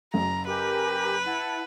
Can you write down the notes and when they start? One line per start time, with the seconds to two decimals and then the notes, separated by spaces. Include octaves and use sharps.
0.14 F#1 F#2 A#5
0.47 G4 A#4 B4 G#5
1.25 E4 F#5 A5